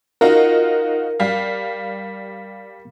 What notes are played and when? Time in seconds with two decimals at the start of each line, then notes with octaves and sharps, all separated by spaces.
0.21 D#4 F4 F#4 A#4
1.20 G3 F5